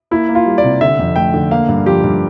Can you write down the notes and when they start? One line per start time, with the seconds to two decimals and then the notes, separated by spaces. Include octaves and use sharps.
0.11 A#3 E4
0.29 A#3
0.35 F4
0.46 G3
0.58 D5
0.64 C3
0.81 D3 E5
0.99 F2
1.16 A3 G5
1.34 D3
1.51 A#3 F5
1.69 G2
1.86 F3 G4
2.04 G2